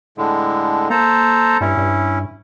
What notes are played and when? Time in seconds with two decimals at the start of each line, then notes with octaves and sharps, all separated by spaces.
0.18 A2 D3 G#3
0.90 A#3 A4 C5 A#5
1.61 G2 C#4 E4
1.77 G2